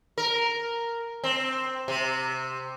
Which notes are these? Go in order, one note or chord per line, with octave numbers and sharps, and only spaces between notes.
A#4
C4
C3